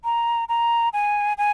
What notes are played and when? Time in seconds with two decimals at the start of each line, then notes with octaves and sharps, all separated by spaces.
0.04 A#5
0.49 A#5
0.93 G#5
1.38 G#5